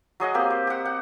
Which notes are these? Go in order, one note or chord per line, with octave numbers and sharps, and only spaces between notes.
F#3 G#4 D#5 F#5
A#3 C4 G4
C5
G4 F#5
F#5